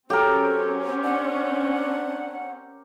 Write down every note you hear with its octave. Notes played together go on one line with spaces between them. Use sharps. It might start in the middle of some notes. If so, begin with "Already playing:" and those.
F#3 C4 C#4 G4 A4 A#4
D4 F#5